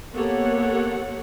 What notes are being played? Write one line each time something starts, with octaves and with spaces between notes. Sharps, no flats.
A#3 B3 G4 A4 C#5 F#5